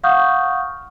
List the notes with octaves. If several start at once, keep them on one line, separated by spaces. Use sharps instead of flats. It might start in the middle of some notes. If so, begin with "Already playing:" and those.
F5 F#5 C#6 D#6 F6 G6